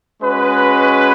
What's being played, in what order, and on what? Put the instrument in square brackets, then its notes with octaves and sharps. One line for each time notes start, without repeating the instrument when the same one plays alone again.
[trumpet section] G#3 C#4 F#4 B4